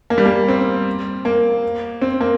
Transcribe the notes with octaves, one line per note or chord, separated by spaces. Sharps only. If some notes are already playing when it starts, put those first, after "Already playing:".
A#3
G3
A#3
C4
A#3
C4
A#3